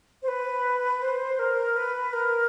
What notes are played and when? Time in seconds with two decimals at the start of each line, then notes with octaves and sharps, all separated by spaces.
0.23 C5
0.28 B4
1.02 C5
1.39 A#4
1.77 B4
2.13 A#4